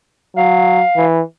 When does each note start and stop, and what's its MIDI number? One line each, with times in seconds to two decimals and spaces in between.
0.36 0.82 54
0.36 1.05 77
0.96 1.21 52